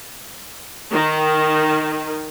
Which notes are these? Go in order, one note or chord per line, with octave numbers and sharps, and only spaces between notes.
D#3